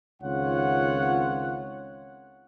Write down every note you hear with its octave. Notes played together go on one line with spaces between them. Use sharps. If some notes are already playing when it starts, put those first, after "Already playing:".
C#2 D#3 C4 F4 C#5 F#5